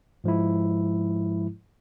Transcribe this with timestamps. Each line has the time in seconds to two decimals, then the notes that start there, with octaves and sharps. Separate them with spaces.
0.24 G#2 F3 G#3 E4